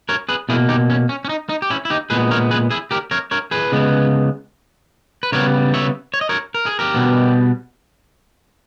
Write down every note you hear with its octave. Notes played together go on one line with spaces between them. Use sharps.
A#4 C#5
G#4 B4
B2 A#3 E4 G#4
D#4 G4
C#4
C#4
C#4
D#4
D#4
G4
C#4 E4
E4
D#4 G4
A#2 G#3 B3 G#4 B4
A#4 C#5
G#4 B4
E4 G#4
G4 A#4
A#4 C#5
A#4 C#5
G#4 B4
C#3 G#3 B3
B4
C#3 G3 B3 A#4 C#5
C#5 E5
C#5
D#5
A#4 C#5
A#4
G#4
G4 A#4
B2 G3 B3